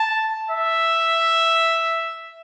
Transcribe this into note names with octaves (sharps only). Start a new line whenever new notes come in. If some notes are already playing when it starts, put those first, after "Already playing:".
Already playing: A5
E5